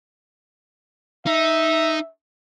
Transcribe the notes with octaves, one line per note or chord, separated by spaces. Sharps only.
D#4 E5